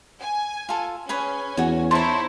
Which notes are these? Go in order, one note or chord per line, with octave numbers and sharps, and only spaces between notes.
G#5
F4 A4
C#4 G#4 B4 C#5 G#5
E2 F#4 C#5
D#4 E4 C5 C#5 A5 C6